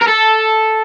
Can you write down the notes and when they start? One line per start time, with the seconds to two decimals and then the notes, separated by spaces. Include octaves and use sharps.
0.02 A#4
0.08 A4